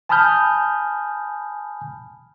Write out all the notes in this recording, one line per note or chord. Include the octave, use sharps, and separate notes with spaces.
G#5 A5 B5 D#6 F6 G6